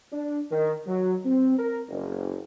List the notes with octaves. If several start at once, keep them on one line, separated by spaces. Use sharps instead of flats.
D4
D#3
F#3
C4
A#4
F#1